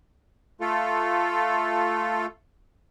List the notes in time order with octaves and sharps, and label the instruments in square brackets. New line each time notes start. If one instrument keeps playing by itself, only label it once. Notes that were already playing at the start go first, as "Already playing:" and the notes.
[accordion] A3 F4 A4